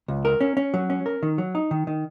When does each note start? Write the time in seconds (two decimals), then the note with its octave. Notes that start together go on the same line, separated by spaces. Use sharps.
0.08 C#2
0.25 A#4
0.41 C#4
0.57 C#4
0.74 F#3
0.90 C#4
1.06 A#4
1.23 D#3
1.38 F#3
1.55 D#4
1.71 D#3
1.87 D#3